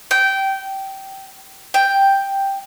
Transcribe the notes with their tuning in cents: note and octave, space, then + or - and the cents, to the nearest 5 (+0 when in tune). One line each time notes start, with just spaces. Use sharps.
G5 -15
G5 +5